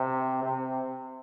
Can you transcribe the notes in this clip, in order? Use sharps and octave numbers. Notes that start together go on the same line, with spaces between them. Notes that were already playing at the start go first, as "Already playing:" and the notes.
Already playing: C3
C3